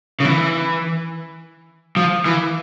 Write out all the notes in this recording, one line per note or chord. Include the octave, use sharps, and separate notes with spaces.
C#3
E3
F3
E3